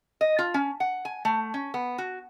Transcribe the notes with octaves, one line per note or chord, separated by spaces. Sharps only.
D#5
F4
C#4
F#5
G#5
A3
C#4
B3
F#4